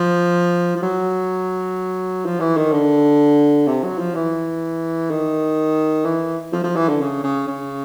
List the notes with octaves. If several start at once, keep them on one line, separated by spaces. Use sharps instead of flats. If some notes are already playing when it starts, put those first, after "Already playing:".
Already playing: F3
F3
F#3
F3
E3
D#3
D3
C3
F#3
F3
E3
D#3
E3
F3
F3
E3
D3
C#3
C#3
C#3